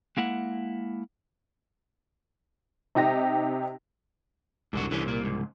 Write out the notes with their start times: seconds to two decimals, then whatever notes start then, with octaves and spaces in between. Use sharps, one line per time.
0.17 G#3 A#3 E4 F#5
2.95 C3 D#4 G4 A#6
4.73 E1 C2 G#2 D3 F#4
4.91 C2 D3 E3 C#4
5.06 A#2 A#3
5.23 C#2 G#2